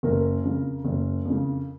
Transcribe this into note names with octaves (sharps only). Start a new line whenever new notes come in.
F#1 A#4
F2 C#3
F#1
F2
C#3